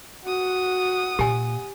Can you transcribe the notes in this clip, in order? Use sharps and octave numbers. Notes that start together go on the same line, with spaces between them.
F#4 F#5 D#6
A#2 G4 G#5